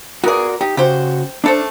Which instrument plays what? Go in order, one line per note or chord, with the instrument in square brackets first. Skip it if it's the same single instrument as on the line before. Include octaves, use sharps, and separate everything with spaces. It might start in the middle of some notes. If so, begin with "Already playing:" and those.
[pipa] B3 G#4 [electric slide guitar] F#4 A#4 D5
[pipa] D#4 [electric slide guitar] G4
[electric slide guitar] C#3 F#4 [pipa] G4 C5
[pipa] A3 A4 C5 [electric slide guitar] D4